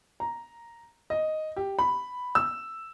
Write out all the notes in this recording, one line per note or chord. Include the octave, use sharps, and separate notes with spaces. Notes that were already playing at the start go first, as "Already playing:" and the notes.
A#5
D#5
G4
B5
E6